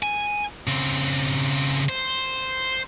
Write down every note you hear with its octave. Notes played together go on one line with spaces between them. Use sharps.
G#5
C#3 C4
C5